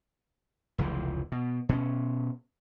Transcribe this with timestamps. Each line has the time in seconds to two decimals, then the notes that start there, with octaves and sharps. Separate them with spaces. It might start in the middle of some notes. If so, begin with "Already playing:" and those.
0.78 F1 C#2 E3 F3
1.32 B2
1.69 B2 C4 C#4